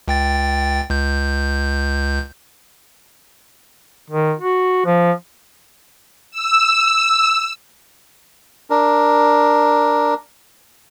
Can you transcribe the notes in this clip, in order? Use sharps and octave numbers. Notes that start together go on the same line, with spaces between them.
C#2 G5 A6
C#2 G6
D#3
F#4
F3
E6
D4 A#4